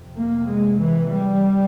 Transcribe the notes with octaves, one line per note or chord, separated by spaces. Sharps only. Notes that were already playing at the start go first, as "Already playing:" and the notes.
Already playing: F2 C3
A#3
G#3
E3
G3